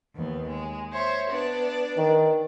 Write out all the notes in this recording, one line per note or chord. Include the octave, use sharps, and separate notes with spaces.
D#2 B3
G#3
C5 C#5 E5
B3 D4 D5
D#3